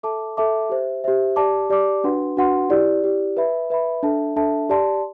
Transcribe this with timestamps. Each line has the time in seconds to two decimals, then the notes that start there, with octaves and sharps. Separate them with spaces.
0.03 A4 E5 A5 D6
0.37 A4 E5 A5 D6
0.70 G4 C5 E5
1.04 G4 C5 E5
1.36 G4 D5 A5 D6
1.70 G4 D5 A5 D6
2.04 D4 F#4 B4 F#5 C6
2.37 D4 F#4 B4 F#5 C6
2.70 E4 G4 D5
3.03 E4 G4 D5
3.37 B4 E5 B5
3.70 B4 E5 B5
4.03 D4 A4 E5 A5
4.36 D4 A4 E5 A5
4.69 G4 D5 A5 C6